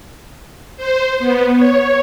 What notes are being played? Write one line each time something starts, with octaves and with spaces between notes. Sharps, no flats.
C5
B3
C#5